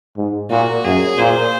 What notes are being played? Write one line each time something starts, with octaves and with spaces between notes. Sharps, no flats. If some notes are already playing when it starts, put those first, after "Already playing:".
G#2
A#2 F#4
F#2 G#4
A#2 C5